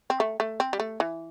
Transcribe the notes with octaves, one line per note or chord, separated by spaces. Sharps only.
C4
A3
A3
C4
G3
A3
E3